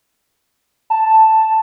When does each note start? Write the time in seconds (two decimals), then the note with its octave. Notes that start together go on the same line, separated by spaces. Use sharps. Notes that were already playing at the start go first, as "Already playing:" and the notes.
0.90 A5